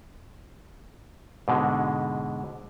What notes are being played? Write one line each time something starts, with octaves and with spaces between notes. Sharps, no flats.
G#2 B2 D3 G#3